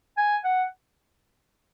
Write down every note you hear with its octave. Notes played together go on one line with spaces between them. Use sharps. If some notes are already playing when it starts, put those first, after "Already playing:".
G#5
F#5